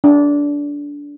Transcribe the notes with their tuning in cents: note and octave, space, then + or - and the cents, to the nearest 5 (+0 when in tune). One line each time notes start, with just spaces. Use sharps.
D4 -20